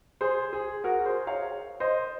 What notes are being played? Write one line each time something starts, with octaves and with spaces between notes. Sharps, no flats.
G#4 C5
G#4
F#4 A#4
G#4 C5
C#5 F5
C5 D#5